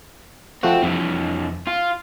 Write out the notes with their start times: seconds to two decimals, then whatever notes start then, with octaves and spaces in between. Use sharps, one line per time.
0.63 F3 A3 C4 F#4
0.83 F2 C3 E3
1.67 F4